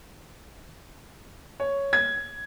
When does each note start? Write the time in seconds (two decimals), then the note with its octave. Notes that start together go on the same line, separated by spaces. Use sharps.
1.60 C#5
1.93 G#6